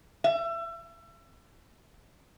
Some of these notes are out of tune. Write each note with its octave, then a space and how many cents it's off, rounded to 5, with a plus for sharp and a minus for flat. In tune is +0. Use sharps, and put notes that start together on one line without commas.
E5 +30